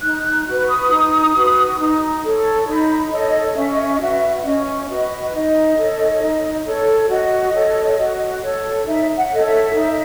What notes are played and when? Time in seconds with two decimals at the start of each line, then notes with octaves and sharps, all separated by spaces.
0.03 D#4 F#6
0.25 F#6
0.47 F#4 B4 F#6
0.69 D#6
0.91 D#4
1.35 F#4 B4
1.79 D#4
2.24 A4 C#5
2.68 D#4 B5
3.12 A4 C#5 D#5
3.56 C#4 E5
3.70 D#5
3.83 E5
3.94 D#5
4.01 F#4 B4 E5
4.45 C#4 D#5
4.89 F#4 B4 D#5
5.11 D#5
5.33 D#4 D#5
5.78 A4 C#5
6.21 D#4
6.66 A4 C#5
7.09 F#4 D#5
7.54 A4 C#5
7.99 F#4
8.43 A4 C#5
8.87 D#4 E5
9.17 F#5
9.31 A4 C#5 D#5
9.46 E5
9.75 D#4